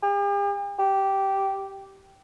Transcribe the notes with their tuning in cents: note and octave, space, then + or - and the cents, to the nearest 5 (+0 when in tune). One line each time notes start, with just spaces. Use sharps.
G4 +45
G4 -10